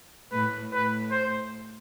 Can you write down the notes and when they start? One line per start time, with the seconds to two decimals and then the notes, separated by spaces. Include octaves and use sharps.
0.32 A2 B4
0.72 A2 B4
1.11 C5